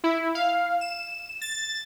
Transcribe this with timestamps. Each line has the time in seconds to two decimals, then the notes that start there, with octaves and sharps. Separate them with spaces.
0.04 E4
0.35 F5
0.81 E7
1.41 A6